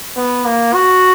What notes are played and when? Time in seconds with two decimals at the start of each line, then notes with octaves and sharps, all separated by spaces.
0.17 B3
0.45 A#3
0.74 F#4